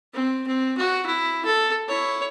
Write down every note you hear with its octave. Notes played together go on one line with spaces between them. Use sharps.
C4
C4
F#4
E4
A4
E4 C#5